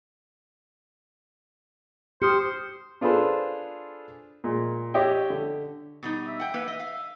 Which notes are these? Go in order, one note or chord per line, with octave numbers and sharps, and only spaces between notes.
G4 C5 D#6 F6 C#7
D4 F4 G#4 A4 B4 C5
A#2 G#3
G4 C#5 D#5 E5 G5
D3
B2 G3 D#4
E5
F#5 G5
A#3 B4
D#5 E5
F5